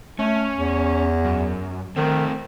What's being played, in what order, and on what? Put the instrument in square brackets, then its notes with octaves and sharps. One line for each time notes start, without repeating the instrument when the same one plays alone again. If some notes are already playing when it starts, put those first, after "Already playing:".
[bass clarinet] A3 [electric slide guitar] C#4
[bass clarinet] E2
[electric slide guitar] F#2
[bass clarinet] D#3 [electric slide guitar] A3 C4